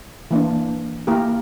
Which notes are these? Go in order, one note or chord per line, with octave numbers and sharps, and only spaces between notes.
E3 A#3 D4
A#3 E4 G4 A#4